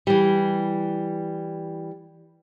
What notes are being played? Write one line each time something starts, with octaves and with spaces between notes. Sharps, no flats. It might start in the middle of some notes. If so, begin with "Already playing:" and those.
E3 G3